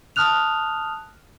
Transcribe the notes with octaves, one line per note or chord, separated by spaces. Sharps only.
A5 D#6 F6 F#6 F7